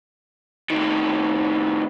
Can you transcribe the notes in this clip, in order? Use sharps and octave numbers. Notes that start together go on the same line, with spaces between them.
A2 D#3